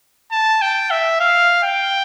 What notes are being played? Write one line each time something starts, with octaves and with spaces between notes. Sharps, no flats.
A5
G5
E5
F5
G5